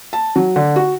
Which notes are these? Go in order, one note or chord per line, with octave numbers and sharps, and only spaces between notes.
A5
F#3
D3
F#4